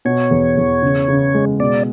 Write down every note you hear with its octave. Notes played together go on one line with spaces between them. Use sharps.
B2 C#5
E2
E2
C#3
C#3
G#3
B2 D5